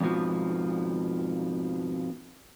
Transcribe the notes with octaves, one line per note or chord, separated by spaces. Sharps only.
F2 G#2 B2 F3